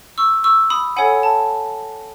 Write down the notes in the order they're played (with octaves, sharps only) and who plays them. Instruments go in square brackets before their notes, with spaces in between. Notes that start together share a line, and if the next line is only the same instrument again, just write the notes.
[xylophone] C#6 E6
C#6 E6
B5 D#6
A4 C#5 F#5 G#5 B5
A5